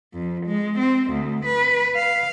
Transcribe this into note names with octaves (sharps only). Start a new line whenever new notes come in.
F2
G#3
C4
D2
B4
F5